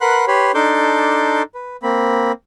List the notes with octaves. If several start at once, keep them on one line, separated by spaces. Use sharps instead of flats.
A#4 B4 F#5 B5 C6 F#6
G4 B4 C#5 B5 C6
D4 D#4 A4 C6 D6 G6
B4
A#3 C4 B5